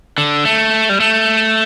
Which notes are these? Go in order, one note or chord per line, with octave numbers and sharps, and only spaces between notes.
D3
A3
G3
A3